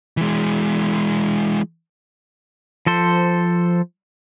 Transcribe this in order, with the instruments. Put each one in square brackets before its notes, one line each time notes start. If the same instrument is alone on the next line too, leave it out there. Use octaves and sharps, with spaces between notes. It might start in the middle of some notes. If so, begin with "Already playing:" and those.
[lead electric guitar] E3 G#3
[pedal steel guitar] F3 A4 C5